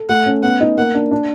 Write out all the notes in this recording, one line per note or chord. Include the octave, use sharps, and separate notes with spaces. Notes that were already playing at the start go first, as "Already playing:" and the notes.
Already playing: A4
A3 F#5
C#4
B3 F#5
D#4
A#3 F#5
D4
D4